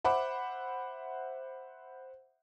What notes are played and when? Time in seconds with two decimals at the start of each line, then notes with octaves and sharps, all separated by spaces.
0.04 C5 E5 F#5 B5 D6